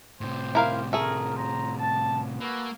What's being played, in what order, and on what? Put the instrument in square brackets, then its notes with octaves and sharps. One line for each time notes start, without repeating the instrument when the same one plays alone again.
[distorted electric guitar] A2 C3 [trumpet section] G4 C5
[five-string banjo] E4 A#4 F5
[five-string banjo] A3 G#4 [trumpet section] A#4
[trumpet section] C5 A#5
A5
[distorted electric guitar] A#3 [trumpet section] F#4 A4 B4